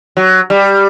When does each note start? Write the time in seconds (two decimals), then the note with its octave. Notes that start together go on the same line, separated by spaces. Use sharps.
0.17 F#3
0.50 G3